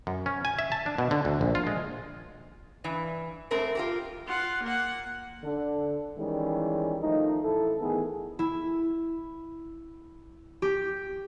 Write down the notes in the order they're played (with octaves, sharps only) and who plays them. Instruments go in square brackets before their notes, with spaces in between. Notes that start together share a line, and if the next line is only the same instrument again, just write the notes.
[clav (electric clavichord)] F#2
C#4
G#5
E5
A5
D4
B2
D3
D2
A#1
F4
G#3
[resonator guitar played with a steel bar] G2 E3
G#2 A3 C4 A#4
F4 G4 A#4
[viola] F4 F#5
A#3 F#5
[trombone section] D3
D#3 E3 G3 G#3 C#4
D#3 F3 A3 D#4
A1 E4 A4
D#3 E3 A3 B3 G#4
[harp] E4
G4